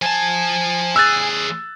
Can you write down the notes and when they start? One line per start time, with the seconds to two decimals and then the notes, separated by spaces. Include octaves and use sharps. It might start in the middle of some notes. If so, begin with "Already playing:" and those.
0.02 F3 G#5 A5
0.96 D#2 G#4 E6 F#6 A6